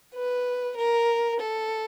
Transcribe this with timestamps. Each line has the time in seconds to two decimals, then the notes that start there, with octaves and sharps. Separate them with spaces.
0.15 B4
0.77 A#4
1.40 A4